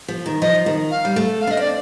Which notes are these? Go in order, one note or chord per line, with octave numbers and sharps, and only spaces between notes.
F3
D#3
F3 D#5
D#3
F5
G3
A3
F5
D4 D#5
C4 D5